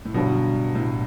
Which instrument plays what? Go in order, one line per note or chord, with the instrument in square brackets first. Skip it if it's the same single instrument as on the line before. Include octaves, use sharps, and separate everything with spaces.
[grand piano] A2
[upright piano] G2 D3 F#3 [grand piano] B2
[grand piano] A2